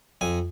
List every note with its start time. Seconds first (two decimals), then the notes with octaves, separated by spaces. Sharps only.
0.21 F2 G#5